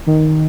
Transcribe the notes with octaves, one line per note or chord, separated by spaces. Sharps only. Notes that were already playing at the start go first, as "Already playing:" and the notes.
D#3